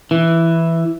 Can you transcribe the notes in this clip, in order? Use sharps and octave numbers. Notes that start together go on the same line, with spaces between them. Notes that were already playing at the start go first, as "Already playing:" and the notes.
E3